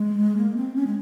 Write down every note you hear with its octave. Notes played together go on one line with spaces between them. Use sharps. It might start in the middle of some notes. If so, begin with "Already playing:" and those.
Already playing: G#3
A#3
C4
C#4
G#3